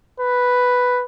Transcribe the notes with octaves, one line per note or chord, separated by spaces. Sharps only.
B4